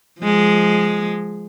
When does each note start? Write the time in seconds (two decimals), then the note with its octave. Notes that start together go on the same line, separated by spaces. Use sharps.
0.21 F3 G#3